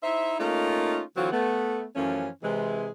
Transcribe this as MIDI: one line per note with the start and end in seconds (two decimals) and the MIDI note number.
0.03 0.36 63
0.03 0.36 64
0.03 0.36 72
0.03 0.36 76
0.39 1.02 57
0.39 1.02 58
0.39 1.02 61
0.39 1.02 63
0.39 1.02 65
1.16 1.31 50
1.16 1.31 52
1.16 1.31 54
1.16 1.31 60
1.16 1.31 65
1.16 1.31 66
1.32 1.85 57
1.32 1.85 59
1.96 2.29 42
1.96 2.29 52
1.96 2.29 53
1.96 2.29 57
1.96 2.29 61
2.44 2.91 48
2.44 2.91 52
2.44 2.91 56